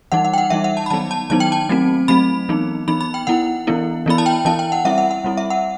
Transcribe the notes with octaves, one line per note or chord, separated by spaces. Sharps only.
E3 G3 D#4 F#5
F#5
G5
F#5
E3 G3 D#4 E5
F#5
A5
B5
D#3 F#3 B3 D#4 A5
A5
D#3 F#3 B3 D#4 A5
G5
A5
F#3 A3 C4
F#3 A3 C4 B5
E3 B3 D#4
E3 B3 D#4 B5
B5
G5
E3 B3 E4 F#5
E3 B3 E4
E3 B3 E4 B5
A5
G5
E3 B3 E4 A5
G5
F#5
G3 C4 E4 E5
F#5
F#5
G3 C4 E4
E5
F#5